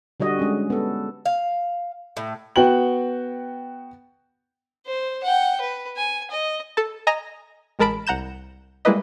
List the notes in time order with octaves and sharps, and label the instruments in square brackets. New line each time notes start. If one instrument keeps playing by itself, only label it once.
[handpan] D3 G3 F#4 D#5
G#3 C#4
B3 A4
[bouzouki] F5
A2
[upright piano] B3 F#4 G5 F#7
[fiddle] C5
F#5 G5
B4
G#5
D#5
[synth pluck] A4 A5
D#5 G#5 A#5 D#6 A#6
A1 G#3 A#4 A5 B5 D7
C2 F#5 A#5 G6 E7
G3 G#3 A#3 E4 B4 D#5